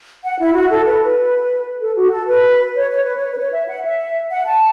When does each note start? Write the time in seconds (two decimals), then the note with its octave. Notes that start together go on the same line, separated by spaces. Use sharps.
0.24 F#5
0.39 E4
0.55 F#4
0.70 A4
0.86 B4
1.03 B4
1.81 A4
1.96 F#4
2.11 A4
2.27 B4
2.75 C#5
2.91 C#5
3.04 B4
3.16 C#5
3.32 B4
3.37 C#5
3.53 E5
3.68 F#5
3.84 E5
4.31 F#5
4.46 A5